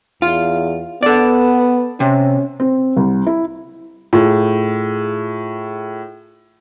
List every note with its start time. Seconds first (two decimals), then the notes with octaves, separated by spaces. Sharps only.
0.22 E2 F4
1.03 B3 A4 D5
2.00 C3 C#4
2.60 C4
2.97 C2
3.27 E4
4.13 A2 F4 G#4